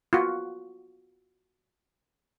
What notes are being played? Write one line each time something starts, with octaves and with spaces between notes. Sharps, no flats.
F4 F#4